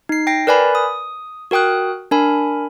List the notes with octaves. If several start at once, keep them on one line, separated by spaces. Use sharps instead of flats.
D#4 C7
G5 A#6 C7
A#4 B4 D5 G#5 B5
D#6
F#4 A#4 G5 D#6 F#6
D4 A#4 G#5 B5